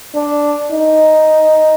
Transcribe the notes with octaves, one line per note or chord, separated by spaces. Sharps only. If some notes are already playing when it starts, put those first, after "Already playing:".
D4
D#4